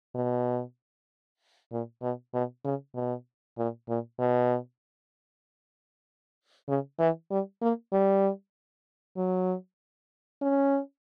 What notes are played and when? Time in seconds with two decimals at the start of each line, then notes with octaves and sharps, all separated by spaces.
0.15 B2
1.71 A#2
2.02 B2
2.34 B2
2.65 C#3
2.95 B2
3.58 A#2
3.88 A#2
4.19 B2
6.68 C#3
6.99 E3
7.31 G3
7.62 A#3
7.92 G3
9.17 F#3
10.42 C#4